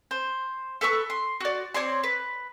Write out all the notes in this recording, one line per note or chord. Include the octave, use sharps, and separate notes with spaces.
C5
A4 B4 C#6 E6
C6
F#4 D5
C4 C#5 D5 C6
B4